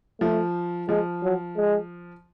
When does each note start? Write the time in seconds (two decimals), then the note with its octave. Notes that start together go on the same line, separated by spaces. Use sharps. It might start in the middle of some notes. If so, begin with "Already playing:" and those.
0.20 F3 A3
0.89 F3 G#3
1.23 F#3
1.57 G#3